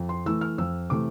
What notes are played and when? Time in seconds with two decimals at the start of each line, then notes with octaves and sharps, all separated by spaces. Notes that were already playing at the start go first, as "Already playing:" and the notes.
Already playing: F2
0.09 C6
0.26 E3 A3 E6
0.41 F6
0.58 F2 E6
0.90 C3 E3 A3 D6